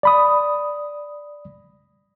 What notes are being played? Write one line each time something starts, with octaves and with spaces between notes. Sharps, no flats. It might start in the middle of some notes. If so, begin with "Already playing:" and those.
D5 B5 D#6